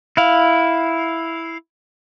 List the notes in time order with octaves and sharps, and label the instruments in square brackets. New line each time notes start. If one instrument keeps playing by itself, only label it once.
[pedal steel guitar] E4 F5